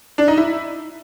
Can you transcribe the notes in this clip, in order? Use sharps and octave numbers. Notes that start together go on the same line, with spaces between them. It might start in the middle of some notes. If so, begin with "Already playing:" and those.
D4
D#4
E4